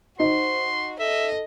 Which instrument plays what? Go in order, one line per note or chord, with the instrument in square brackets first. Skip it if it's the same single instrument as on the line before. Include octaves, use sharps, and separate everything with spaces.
[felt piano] D#4 [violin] F#4 [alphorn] C5 [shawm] C6
[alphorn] A4 [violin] D#5 [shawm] E5